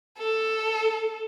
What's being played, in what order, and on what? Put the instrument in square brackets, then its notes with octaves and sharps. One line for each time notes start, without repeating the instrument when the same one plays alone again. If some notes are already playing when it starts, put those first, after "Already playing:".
[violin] A4